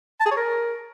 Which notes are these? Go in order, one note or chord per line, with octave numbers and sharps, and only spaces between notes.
A5
G#4
C#5
A#4